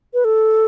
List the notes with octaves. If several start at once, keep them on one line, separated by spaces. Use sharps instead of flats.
B4
A4